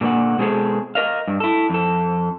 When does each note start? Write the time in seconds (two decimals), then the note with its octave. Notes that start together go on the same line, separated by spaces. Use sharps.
0.01 A#2 D3 G3 A#3 F#5
0.38 B2 G#3 C4 F4 G#4 A4
0.95 A#4 D#5 F5
1.28 G2
1.40 E4 A4
1.70 F2 A4